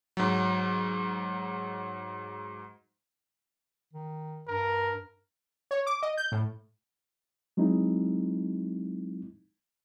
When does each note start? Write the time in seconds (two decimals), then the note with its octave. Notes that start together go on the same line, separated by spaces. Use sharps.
0.17 G#2 F#3
3.93 D#3
4.48 G2 A#4
5.71 C#5
5.87 D6
6.03 D#5
6.17 G6
6.32 A2
7.57 F#3 G#3 C4 D#4 E4